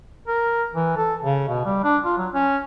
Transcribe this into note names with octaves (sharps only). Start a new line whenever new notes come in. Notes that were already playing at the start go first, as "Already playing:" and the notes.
A#4
E3
A4
C#3
B2
G3
D4
F4
F#3
C#4